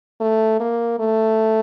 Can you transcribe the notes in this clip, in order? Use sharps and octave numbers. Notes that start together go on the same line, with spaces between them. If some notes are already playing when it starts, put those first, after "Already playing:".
A3
A#3
A3